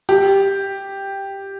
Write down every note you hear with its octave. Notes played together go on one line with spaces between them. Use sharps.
G4